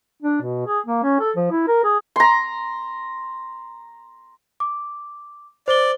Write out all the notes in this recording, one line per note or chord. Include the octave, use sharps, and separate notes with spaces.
D4
B2
G#4
A#3
C#4
A4
F3
E4
A#4
G#4
A#5 C6
D6
C5 D5 G7